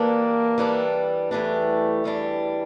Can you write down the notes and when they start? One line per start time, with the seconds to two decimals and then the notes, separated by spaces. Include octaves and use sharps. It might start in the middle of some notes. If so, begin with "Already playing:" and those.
Already playing: E3 G3 A#3 D4 A4
0.58 E3 G3 D4 A4
1.31 E2 E3 G3 A3 D4
2.04 E2 E3 G3 D4